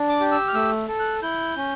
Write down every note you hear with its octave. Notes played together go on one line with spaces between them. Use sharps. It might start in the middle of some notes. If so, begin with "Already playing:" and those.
Already playing: D4
D6
G4
E6
F6
A3 E6
A4
F#6
E4 G6
C#4